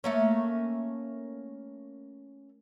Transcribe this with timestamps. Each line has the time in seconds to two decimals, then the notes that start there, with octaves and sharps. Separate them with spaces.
0.04 A3 A#3 C#4